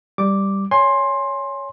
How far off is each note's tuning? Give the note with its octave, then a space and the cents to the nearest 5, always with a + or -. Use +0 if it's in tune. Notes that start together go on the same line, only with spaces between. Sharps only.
G3 +0 D6 +0
C#5 +10 G#5 +0 C6 +15